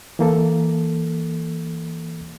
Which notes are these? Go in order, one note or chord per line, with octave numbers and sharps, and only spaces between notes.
E3 A#3 A4